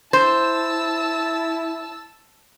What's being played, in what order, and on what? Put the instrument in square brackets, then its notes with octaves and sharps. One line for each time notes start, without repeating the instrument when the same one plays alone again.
[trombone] E4 [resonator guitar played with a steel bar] C5 [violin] A5 E6